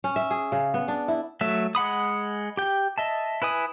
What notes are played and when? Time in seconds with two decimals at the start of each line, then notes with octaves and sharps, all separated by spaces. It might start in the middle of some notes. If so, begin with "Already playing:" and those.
0.04 C#4
0.16 E5
0.31 G#4
0.52 C#3
0.74 B3
0.88 D4
1.08 E4
1.41 F#3 A3 E5
1.75 G#3 F#5 B5 D#6
2.57 G4 G5
2.98 D#5 E5 A5
3.42 E4 B4 G#5 D#6